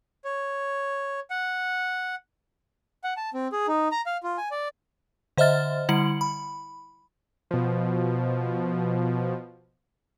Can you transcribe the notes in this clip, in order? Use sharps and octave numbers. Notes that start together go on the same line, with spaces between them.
C#5
F#5
F#5
A5
C4
G#4
D#4
A#5
F5
F4
G#5
D5
D3 C5 D#5 E5 F6 A6
D3 G3 E4 C#7 F#7
B5
B2 F3